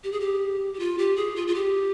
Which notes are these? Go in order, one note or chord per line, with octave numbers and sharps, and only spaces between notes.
G4
G#4
G4
G4
F4
G4
G#4
F4
F4
G4